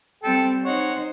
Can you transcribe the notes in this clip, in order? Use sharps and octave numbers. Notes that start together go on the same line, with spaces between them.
G3 C4 A4 G5
D#4 C5 C#5 F#5